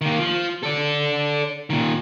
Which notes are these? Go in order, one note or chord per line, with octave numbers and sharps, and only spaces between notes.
D#3 A#3
F3
A4 D5
A#2 D#3